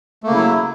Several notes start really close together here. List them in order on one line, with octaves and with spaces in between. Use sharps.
A3 A#3 C#3 E4 F#3